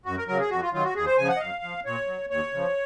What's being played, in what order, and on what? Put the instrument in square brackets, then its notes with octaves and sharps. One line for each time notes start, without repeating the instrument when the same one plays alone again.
[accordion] F#2 F#4
A#4
C#3 F#3 A#4
G#4
F2 F#4
F4
D#3 F#3 F4
F#4
D#2 G#4
C5
C#3 F3 G#5
F#5
D#5
F#2 F5
F3
A#2 C#5
F#3
D#2 C#5
C#3 F3